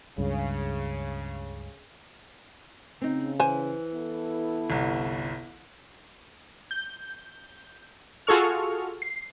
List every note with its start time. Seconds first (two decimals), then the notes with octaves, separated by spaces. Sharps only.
0.18 C#2 G2 C#3
3.01 C#3 C4 D#4
3.39 E3 C5 G#5
3.94 B3 E4 A4
4.70 G1 C2
6.71 G6
8.27 F4 F#4 G#4 A4 C#6 F6
9.02 C7